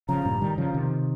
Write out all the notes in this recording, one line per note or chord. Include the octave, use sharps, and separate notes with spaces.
C#3 F3 A#5
G2 A#2
D#3 G3
C#3 F3
C3 D#3